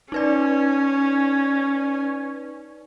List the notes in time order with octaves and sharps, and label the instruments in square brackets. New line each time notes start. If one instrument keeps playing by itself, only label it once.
[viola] C#4 [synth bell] D#4 B4 D5